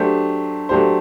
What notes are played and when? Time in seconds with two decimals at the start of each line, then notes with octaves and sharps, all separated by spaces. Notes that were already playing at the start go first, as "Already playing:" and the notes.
Already playing: F#3 A3 D4 G4 C5
0.69 F#3 A3 D4 G4 C5